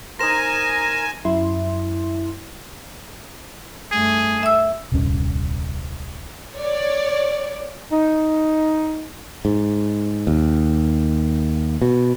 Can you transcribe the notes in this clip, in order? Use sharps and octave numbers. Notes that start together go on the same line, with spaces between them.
D#4 A#4 C5 G#5 A#5 A#6 E7
F#2 E4 C6
G2 A3 G#4
E5 E6
D#1 C2 G2 C#4
C#5 D5
D#4
G#2
D#2
B2